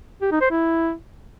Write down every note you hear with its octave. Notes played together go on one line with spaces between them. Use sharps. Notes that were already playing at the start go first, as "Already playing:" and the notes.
G4
D#4
C5
E4